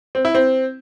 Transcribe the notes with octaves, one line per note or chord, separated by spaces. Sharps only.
C4
E4
C4